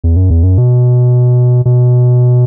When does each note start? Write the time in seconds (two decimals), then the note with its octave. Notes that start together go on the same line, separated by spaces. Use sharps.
0.04 E2
0.16 F#2
0.30 E2
0.43 F#2
0.58 B2
1.65 B2